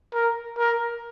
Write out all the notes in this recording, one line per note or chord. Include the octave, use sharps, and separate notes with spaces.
A#4
A#4